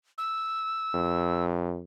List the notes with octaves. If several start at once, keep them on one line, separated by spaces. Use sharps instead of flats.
E6
F2